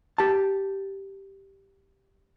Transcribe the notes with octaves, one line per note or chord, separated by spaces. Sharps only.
G4 A5